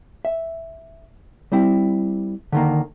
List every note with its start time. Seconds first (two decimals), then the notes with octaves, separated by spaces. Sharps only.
0.25 E5
1.52 G3 C4 E4
2.52 D3 D#3 A#3